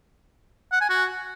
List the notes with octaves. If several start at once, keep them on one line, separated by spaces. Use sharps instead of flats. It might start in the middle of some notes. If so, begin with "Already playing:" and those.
F#5
G#5
F#4